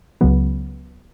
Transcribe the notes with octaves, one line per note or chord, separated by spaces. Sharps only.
C#2 C#3 F#3 B3